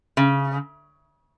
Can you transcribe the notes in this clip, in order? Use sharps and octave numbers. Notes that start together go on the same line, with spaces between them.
C#3